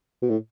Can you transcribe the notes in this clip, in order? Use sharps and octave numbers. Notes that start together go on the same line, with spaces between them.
B2
A2